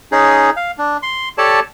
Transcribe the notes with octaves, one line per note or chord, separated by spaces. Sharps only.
C#4 D#4 G#4
F5
D4
C6
G4 A4 C#5 D5 A5